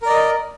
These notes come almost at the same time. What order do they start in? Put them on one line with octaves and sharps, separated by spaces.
A#4 D5 D#5